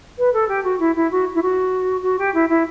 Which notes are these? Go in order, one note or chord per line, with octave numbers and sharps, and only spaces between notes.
B4
A4
G4
F#4
E4
E4
F#4
E4
F#4
F#4
G4
E4
E4